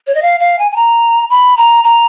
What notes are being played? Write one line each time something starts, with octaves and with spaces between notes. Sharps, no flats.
C#5
D#5
F5
F5
G#5
G#5
A#5
B5
A#5
A#5